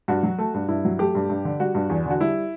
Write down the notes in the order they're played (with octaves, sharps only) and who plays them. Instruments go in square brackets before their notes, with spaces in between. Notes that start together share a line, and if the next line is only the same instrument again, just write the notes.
[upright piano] G2 F#4
F#3
A3
G2
G2 E4
F#3
A3 G4
G2
G2
D3
G3 F#4
G2
E2
D3 F#4
G3 E4